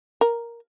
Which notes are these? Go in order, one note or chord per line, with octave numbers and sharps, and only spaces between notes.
A#4